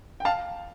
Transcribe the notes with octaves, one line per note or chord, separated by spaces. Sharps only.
G5
F5 A5